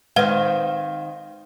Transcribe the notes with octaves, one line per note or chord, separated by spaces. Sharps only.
D#3 G#3 C4 B4 F5 F#5